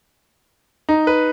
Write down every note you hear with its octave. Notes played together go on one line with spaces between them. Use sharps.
D#4
B4